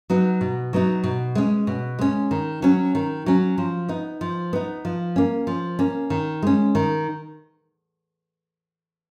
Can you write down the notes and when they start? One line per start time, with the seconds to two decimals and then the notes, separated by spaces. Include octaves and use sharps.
0.10 F#3 B3 D#4
0.41 B2
0.73 F#3 B3 D#4
1.04 B2
1.35 G#3 C#4
1.67 B2
1.99 G#3 C#4
2.31 D#3
2.62 F#3 C#4
2.95 D#3
3.26 F#3 C#4
3.58 F3
3.89 B3 D#4
4.21 F3
4.53 B3 D#4
4.85 F3
5.16 A#3 C#4
5.47 F3
5.79 A#3 C#4
6.10 D#3
6.42 G#3 C#4
6.75 D#3